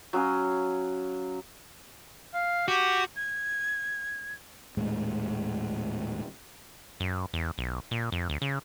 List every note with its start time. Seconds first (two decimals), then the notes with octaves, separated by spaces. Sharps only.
0.13 F#3 C#4 F5 D#6
2.34 F5
2.68 F#4 G4
3.16 G#6
4.77 D#1 A2 G#3
7.00 F#2
7.34 E2
7.58 B1
7.91 A#2
8.12 F2
8.29 D2
8.42 C#3